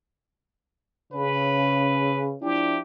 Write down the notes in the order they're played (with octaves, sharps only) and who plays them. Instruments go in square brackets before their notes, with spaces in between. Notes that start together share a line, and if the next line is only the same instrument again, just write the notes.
[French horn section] C#3 [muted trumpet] B4
[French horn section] F3 D4 E4 [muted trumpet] G4